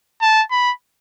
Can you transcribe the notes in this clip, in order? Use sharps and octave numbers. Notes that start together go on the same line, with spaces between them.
A5
B5